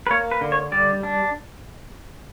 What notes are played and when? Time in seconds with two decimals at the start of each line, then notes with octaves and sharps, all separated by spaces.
0.07 B4
0.11 A#3 C#5
0.31 B4
0.41 D3
0.52 C#5
0.72 G3 D5
1.03 D4